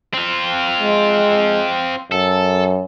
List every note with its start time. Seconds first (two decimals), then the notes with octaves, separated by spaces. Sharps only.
0.14 C4 F4
0.81 G#3
2.12 F#2 A4